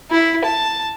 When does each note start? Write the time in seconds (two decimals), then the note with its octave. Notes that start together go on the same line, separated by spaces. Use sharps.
0.11 E4
0.44 A5